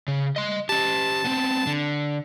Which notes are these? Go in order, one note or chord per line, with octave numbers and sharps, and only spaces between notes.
C#3
D#5 C6
C#4 G4 A5
B3 C4
D3